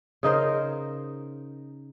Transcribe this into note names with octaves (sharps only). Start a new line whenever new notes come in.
C#3 D#4 A#4 C5